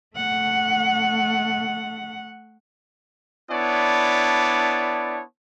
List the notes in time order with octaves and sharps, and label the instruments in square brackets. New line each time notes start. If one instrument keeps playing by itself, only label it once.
[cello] A3 F#5
[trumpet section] B3 D4 E4 C#5 D5 A5